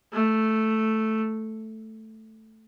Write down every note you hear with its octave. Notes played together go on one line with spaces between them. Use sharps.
A3